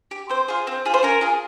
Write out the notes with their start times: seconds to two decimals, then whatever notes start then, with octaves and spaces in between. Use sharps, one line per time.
0.11 G4
0.29 C4 C5
0.48 F4 G#4
0.67 C4
0.85 F4 G#4
0.94 C5
1.03 C#4 A#4
1.21 F4 G#4